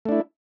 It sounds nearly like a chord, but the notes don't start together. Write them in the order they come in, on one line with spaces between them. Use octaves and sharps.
A3 D4 E4